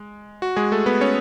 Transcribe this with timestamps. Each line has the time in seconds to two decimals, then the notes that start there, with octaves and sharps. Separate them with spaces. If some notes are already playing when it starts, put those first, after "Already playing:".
Already playing: G#3
0.42 F#4
0.56 G#3 G#4
0.72 A3 A4
0.86 B3 B4
1.01 C#4 C#5